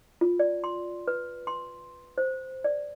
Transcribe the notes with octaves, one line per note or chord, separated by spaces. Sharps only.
F4
D5
C6
B4
C6
C5
D5